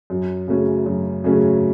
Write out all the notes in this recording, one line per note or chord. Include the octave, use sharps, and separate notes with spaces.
F#2
C#3 F#3 A3 C#4
F#2
C#3 F#3 A3 C#4